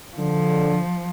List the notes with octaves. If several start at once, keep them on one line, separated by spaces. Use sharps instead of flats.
D3 F3